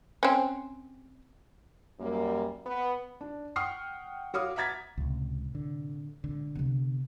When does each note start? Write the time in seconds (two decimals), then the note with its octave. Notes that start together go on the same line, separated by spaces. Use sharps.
0.23 C4 C#4
2.00 F#2 G3 A#3
2.66 B3
3.21 D4
3.56 F#5 G5 C#6 D#6 F6 C7
4.34 F#4 C#5 F5 D6 D#6 F6
4.56 E5 F#5 A#5 G#6 A6 B6
4.97 C#2 A2 C3
5.55 D3
6.24 B2 D3 G#3
6.55 C3 B3